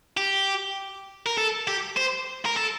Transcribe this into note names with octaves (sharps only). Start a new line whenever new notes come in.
G4
A#4
A4
G4
C5
A#4
A4